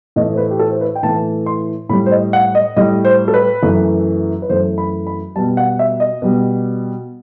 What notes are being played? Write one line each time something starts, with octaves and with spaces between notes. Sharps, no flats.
A2 E3 A3 D#5
C5
B4
G4
A4
C5
B4
G5
A2 E3 A3 A5
C6
A2 G3 B5
C5
D#5
F#5
D#5
A2 G3 D#5
C5
A4
B4
F#2 E3 A3
B4
F#2 E3 A3 C5
B5
B5
B2 G3 A5
F#5
E5
D#5
B2 G3